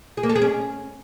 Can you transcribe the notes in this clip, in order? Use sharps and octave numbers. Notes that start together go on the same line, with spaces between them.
G#4
A#3
A4
G#4
C#4